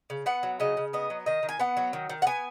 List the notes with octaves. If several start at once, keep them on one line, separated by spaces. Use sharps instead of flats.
C#3
B3 F#5
F#3
C#3 D#5
C#3
B3 D#5
F#3
D#3 D#5
D#3
G#5
B3 F#5
F#3
D#3
D#3
F#5
B3 G#5